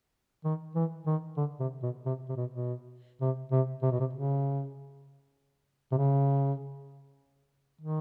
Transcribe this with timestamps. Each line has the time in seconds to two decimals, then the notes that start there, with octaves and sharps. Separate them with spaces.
0.45 D#3
0.75 E3
1.07 D#3
1.37 D3
1.60 C3
1.83 B2
2.06 C3
2.29 C3
2.37 B2
2.53 B2
3.21 C3
3.51 C3
3.82 C3
3.91 B2
4.00 C3
4.13 C#3
5.92 C3
5.97 C#3
7.81 D#3